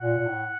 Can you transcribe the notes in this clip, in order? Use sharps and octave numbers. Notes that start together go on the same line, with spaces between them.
A#2 F#5
A#2
A2